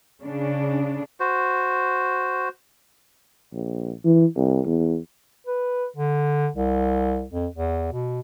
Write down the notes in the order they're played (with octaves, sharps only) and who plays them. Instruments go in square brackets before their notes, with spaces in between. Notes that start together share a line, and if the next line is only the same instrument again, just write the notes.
[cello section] C#3 D4
[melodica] F#4 C5
[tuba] A#1
E3
C2
E2
[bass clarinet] B4
D3
C2
F2
E2
B2